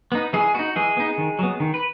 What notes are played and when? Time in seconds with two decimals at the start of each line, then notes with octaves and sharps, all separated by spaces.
0.12 B3 D#4
0.33 E3 G#3 G#4
0.54 B3 D#4 F#4
0.76 E3 G#3 G#4
0.97 B3 D#4
1.18 D#3
1.39 F#3 B3
1.60 D#3
1.74 B4